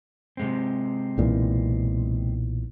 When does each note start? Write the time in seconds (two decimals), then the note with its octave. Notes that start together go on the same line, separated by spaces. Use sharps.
0.37 C3 G#3 C4
1.18 B1 A#2 E3